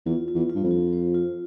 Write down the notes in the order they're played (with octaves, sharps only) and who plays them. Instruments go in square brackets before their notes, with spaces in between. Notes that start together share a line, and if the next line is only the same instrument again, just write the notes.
[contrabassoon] E2 [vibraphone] F4
[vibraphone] F4
[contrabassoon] E2
[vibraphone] F4
[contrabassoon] G2
F2
[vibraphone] F4
C5
F4